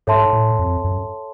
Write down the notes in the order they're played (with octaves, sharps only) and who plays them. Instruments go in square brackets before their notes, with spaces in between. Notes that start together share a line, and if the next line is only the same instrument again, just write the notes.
[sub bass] G#2 [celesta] A4 C#5 E5 A5 C6
[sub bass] A2
F2
F#2